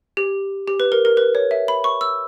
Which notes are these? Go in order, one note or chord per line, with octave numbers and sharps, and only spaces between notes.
G4
G4
B4
A#4
A#4
B4
C#5
E5
B5
C#6
E6